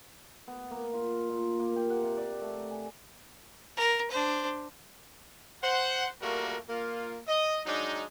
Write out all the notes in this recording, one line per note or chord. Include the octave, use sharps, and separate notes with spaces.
B3
A#3
F4
A#2
A#3
G4
F#5
C3
D5
A3
G#5
A#4
D4 C5
C5 F#5
G3 A3 A#3 F4 F#4 A#4
A#3 F4
D#5
F#3 G#3 D4 D#4